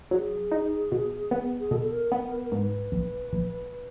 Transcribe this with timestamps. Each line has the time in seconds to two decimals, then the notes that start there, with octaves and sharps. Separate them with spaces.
0.11 F#3 G#4
0.51 D#4
0.92 B2
1.31 B3
1.60 G#4
1.71 B2 A4
1.81 A4
1.91 A#4
2.12 B3 A#4
2.32 B4
2.44 A#4
2.52 G#2 B4
2.92 A#1
3.33 A#1